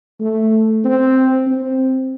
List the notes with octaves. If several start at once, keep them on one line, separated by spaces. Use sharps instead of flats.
A3
C4
C4